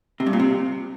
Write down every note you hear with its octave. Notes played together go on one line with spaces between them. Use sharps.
C3
G2
A#2
C3